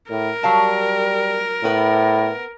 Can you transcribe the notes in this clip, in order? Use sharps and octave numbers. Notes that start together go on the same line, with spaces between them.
A2 A#4
F#3 G3 F5 A5
A2 B3 B4